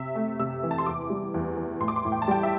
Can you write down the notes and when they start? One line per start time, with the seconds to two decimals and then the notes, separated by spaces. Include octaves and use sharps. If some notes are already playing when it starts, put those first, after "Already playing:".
Already playing: C3 E5
0.15 A3
0.39 C3 E6
0.63 E3
0.71 A5
0.78 C6
0.86 E2 D6
1.10 G3
1.34 E2
1.57 E3
1.80 A2 C6
1.88 D6
1.96 C6
2.05 A2
2.12 G5
2.22 A5
2.28 G3 G5
2.43 E5